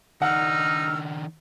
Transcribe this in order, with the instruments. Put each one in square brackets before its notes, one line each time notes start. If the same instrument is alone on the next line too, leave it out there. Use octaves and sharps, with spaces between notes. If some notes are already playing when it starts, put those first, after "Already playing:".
[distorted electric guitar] D#3 D4 [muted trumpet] D#4 [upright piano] F#5 [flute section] E6 F6